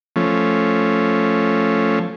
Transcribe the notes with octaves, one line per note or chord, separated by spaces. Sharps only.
F3 A3 C#4